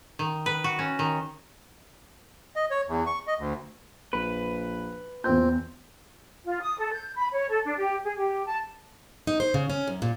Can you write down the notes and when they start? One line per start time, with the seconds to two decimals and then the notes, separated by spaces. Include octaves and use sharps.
0.19 D#3
0.46 B4
0.64 F#4
0.79 C#4
0.99 D#3
2.56 D#5
2.71 C#5
2.88 E2
3.06 C#6
3.27 D#5
3.39 D2
4.13 A#1 B4
5.24 E2 A#2 C4 G6
6.45 F4
6.60 D#6
6.78 A4
6.93 G6
7.17 B5
7.31 C#5
7.49 A4
7.65 D4
7.77 G4
8.04 G#4
8.17 G4
8.46 A5
9.27 D#4
9.40 C5
9.54 C#3
9.70 C#4
9.87 F#2
10.02 A#2